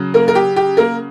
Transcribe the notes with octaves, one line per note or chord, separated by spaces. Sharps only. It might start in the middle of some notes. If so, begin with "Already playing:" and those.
Already playing: C#3 F#3
A#3 A#4
A#4
G4
G4
A#3 A#4